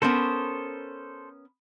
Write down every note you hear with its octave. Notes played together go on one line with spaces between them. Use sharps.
B3 C#4 A4 A#4 C5